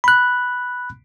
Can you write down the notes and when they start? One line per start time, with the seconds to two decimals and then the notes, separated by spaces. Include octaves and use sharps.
0.04 B5 F#6